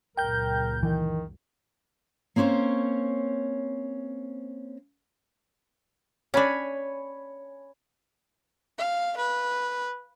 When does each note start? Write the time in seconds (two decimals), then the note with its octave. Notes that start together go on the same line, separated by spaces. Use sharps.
0.17 C#2 F#2 A#2 A#4 G5 G6
0.83 D#3 E3
2.36 A#3 C4 C#4 C5 C#5
6.34 C#4 D4 C#5 G#5 B5
8.78 F5
9.17 B4